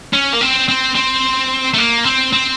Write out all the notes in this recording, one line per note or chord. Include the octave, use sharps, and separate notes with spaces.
C#4
A#3
C4
C4
C4
A3
A#3
C4
C4